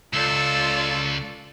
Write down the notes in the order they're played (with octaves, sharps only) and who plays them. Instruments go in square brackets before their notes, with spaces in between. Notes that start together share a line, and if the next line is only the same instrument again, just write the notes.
[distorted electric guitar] C#2 [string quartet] F4 A4 D5 [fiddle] E6